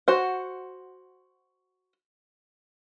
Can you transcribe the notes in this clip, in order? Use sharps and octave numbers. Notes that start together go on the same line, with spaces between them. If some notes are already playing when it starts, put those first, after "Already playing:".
F#4 C5 F#5